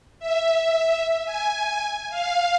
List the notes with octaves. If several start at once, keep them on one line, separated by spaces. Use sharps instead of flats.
E5
G#5
F5